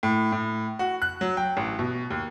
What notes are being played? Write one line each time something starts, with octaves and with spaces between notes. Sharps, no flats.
A2
A2
F#4
F#6
F#3
G5
A1
B2
D#2